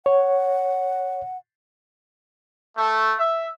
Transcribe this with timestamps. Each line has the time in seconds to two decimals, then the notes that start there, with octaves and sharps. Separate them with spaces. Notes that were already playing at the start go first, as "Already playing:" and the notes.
0.06 C#5 F#5
2.76 A3
3.19 E5